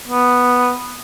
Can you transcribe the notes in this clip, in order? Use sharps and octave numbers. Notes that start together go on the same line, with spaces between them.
B3